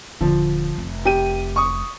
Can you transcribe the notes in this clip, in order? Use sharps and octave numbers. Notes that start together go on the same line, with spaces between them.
D#1 D3 F3
F1
G4 D#7
C#6 D#6